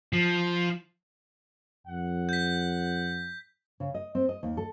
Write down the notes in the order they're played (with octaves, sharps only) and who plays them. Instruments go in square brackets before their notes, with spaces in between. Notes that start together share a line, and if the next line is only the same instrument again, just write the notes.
[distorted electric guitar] F3
[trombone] F2 [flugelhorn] F#5
[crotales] G6 B6
[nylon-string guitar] C#3
D#5
C4
D#5
D#2
A4